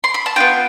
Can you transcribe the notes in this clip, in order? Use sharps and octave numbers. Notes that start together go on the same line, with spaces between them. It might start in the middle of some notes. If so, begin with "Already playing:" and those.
C6
B5
A5
B3 D4 F4 G5